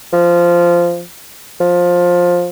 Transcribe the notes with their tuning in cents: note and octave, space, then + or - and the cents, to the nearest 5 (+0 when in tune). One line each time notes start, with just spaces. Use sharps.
F3 -10
F3 +15